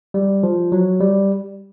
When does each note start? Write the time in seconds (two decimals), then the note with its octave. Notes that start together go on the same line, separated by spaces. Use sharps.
0.14 G3
0.43 F3
0.72 F#3
1.01 G3